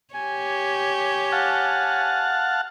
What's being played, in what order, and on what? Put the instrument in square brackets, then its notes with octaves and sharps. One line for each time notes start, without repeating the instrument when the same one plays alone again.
[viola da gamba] G4 C#5 [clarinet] G#5
[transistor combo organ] F5 F#5 A5